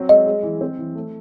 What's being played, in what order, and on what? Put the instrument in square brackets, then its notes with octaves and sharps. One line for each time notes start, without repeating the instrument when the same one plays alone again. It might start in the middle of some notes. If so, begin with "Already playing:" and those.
Already playing: [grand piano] F#3 C4
[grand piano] G#3 [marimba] D#5
[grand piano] G#3
E3
C4
E3
A3